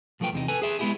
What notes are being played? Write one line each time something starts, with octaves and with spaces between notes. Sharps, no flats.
B1 F3 A3 B4 G5
E2 C3 D#4
A4 B4 G#5
G#4 E5
G#3 B3 C#4 E4 G4 G#4